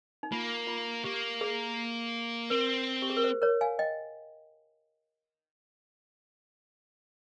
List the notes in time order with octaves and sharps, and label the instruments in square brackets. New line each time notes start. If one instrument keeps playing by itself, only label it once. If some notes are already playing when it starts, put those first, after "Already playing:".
[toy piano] D#4
[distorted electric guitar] A#3 [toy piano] F4
[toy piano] F4
[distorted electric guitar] A#3 [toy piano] G4
[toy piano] G#4
[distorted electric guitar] C4 [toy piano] A#4
[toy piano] G4
G#4
A#4
C5
A#4 C#5
F5 G#5
D#5 G5